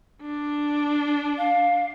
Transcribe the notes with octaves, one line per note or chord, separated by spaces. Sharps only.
D4
F5